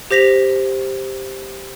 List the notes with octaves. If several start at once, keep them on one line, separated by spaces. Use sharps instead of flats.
G4 C5 A#6 B6 F7